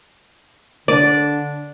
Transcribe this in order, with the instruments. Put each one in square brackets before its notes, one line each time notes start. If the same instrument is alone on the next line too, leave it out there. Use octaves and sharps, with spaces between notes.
[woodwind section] D3 D4 [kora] D5